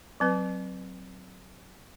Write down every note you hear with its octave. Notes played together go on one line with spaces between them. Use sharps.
F#3 C4 B4